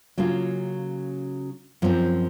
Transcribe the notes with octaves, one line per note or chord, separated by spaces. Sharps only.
C#3 F#3 A#3 C#4 F4
F#2 F3 C4